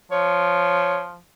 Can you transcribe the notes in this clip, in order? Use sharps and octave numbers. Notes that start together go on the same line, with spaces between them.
F3 C#5